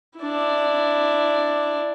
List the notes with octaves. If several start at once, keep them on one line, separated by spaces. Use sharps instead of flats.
D4 E4